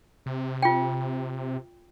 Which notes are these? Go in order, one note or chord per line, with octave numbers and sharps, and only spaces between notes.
C3
F4 G5